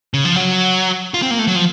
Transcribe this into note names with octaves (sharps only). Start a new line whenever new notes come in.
C#3
F3
F#3
F4
C4
A#3
A3
F#3
F3